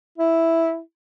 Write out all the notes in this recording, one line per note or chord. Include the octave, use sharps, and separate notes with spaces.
E4